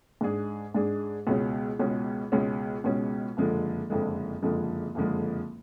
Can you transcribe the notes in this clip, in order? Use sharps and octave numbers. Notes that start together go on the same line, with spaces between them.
G#2 G#3 D4 G#4
G#2 G#3 D4 G#4
C#2 B2 G#3 C#4
C#2 B2 G#3 C#4
C#2 B2 G#3 C#4
C#2 B2 G#3 C#4
F#1 F2 D3 F3 G#3
F#1 F2 D3 F3 G#3
F#1 F2 D3 F3 G#3
F#1 F2 D3 F3 G#3